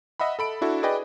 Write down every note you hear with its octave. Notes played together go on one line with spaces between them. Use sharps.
D#5 E5 F#5 B5
A4 B5 D7
D4 E4 F#4 A4
G#4 B4 D5 D#5 G5